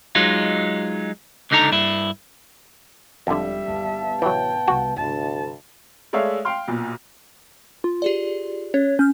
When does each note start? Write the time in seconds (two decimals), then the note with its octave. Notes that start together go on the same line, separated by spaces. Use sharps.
0.15 F#3 G#3 D#4 F4
1.51 C#2 D3 D#4 A4 A#5
1.72 G2 E4
3.27 E1 F2 D3 G3 E5
3.68 G1 D#2 B3 F5 A5
4.22 A1 C3 E3 F#3 G5
4.68 C2 C3 F#4
4.97 D2 G2 C3 A5
6.13 G#3 A3 C#5 D5 E5 F5
6.45 F5 G5 C6 F6
6.68 B1 A#2
7.84 F4
8.02 G4 G#4 D5
8.74 C#4 C#5
8.99 C#4 F6 G6